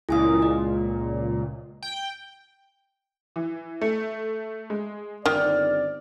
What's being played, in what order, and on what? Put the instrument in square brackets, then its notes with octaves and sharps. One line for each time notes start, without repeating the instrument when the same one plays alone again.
[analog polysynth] C#2 A#2 [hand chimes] E4 G#5 D#6
[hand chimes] D#5
[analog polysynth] G5
[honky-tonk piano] E3
A3
G#3
[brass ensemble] G1 C4 D5 [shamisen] D#3 [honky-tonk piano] F6